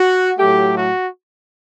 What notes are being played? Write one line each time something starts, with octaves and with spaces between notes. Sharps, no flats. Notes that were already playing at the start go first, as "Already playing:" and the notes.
Already playing: F#4
A2 F#3 A3 G4
F#4